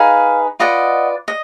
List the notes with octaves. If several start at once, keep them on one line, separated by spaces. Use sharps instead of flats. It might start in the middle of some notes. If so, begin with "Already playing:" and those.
Already playing: D#4 G#4 B4 F5
F4 B4 D5 D#5 F#5
D#5